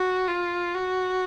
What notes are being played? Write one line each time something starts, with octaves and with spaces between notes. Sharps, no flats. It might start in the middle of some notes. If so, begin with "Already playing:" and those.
Already playing: F#4
F4
F#4